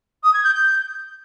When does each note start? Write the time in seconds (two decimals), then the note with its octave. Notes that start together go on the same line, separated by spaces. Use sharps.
0.23 D#6
0.33 G#6
0.44 G6
0.54 G6